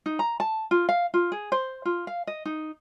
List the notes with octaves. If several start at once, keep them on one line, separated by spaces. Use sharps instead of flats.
D#4
A#5
A5
F4
F5
F4
G#4
C5
F4
F5
D#5
D#4